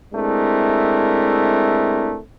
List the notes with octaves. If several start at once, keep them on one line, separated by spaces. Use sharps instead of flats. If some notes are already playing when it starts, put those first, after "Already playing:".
G#3 A3 C4 D4 E4 A#4